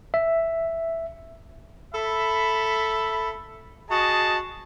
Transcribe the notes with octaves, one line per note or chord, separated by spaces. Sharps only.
E5
A4 E5 B5
F#4 G#4 D#5 A5